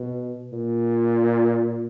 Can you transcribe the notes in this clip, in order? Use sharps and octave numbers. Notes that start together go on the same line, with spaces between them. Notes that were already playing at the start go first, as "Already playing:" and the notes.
Already playing: B2
A#2